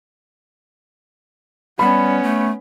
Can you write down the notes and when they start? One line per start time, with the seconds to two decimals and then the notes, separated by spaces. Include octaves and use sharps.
1.79 G3 B3 C#4 B5
2.23 A3